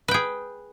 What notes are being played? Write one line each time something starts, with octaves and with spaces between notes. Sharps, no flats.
G#4 B4 G5